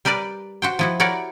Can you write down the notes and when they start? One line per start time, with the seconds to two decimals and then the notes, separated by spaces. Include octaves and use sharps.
0.05 G3 G4 A#4 B4 D5
0.62 F#4 C5 G5
0.79 F3 E4 F#4
1.00 E4 F#4 G4 A#4 C#5 D5